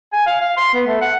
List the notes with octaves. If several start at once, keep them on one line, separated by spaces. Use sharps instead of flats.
G#5
F5
F5
C6
B3
A3
F#5